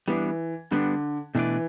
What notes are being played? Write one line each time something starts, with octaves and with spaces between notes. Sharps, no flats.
E3 G3 B3 D4
D3 G3 B3 D4
B2 E3 A3 D4 B4 D5